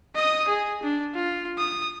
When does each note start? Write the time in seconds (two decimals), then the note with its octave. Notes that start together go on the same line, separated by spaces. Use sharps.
0.15 D#5 D#6
0.48 G#4
0.83 D4
1.15 F4
1.58 D#6